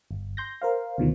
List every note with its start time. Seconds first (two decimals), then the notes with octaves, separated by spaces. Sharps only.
0.11 G1
0.37 C6 G6 A#6
0.62 A#4 C5 F5
0.98 D2 B2 D#3 F3